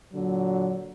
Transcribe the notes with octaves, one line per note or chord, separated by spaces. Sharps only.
A#2 D3 F#3